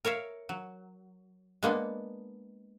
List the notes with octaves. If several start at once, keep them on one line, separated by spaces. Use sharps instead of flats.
A#4 C#5 E5 F5
F#3
G#3 A#3 B3 D4